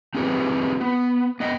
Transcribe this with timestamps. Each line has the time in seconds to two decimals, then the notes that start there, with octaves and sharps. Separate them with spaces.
0.15 C4 D#4 F4 G4 G#4 B4
0.81 B3
1.40 B3 D#5 G5